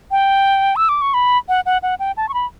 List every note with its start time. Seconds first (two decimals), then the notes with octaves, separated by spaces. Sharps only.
0.11 G5
0.76 E6
0.89 D6
1.02 C#6
1.14 B5
1.49 F#5
1.66 F#5
1.83 F#5
2.00 G5
2.17 A5
2.29 C#6
2.34 B5